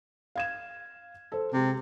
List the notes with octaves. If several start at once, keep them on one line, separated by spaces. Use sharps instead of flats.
F5 G#6 E7
A4 C5
C3 G#3 G4